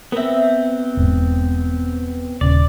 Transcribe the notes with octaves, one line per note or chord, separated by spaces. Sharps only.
B3 C4 A#4 E5
E1 G#2
D#1 C#3 D5